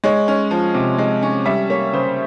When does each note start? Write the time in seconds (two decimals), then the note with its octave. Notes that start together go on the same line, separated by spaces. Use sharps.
0.04 G#3 C#5
0.28 C#4
0.51 F3
0.74 C3
0.98 G#3
1.23 C#4
1.45 G3 E5
1.70 A#3 C#5
1.93 C#3 C5